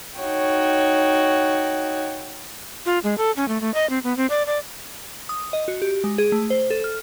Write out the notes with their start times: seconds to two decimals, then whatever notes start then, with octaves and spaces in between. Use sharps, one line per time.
0.19 D#4 F#4 C#5 G5
2.86 F4
3.04 G#3
3.18 A4
3.37 C#4
3.48 A3
3.61 A3
3.74 D#5
3.90 C4
4.04 B3
4.17 C4
4.30 D5
4.47 D5
5.29 D#6
5.53 D#5
5.68 F#4
5.82 G4
6.04 G#3
6.18 G#4
6.32 A3
6.50 C5
6.70 A4
6.84 F6